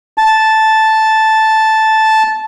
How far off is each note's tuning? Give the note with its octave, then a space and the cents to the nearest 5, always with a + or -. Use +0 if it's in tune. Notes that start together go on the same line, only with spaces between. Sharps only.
A5 -5